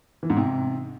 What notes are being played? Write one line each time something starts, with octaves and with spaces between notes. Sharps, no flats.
E3
G#2
C3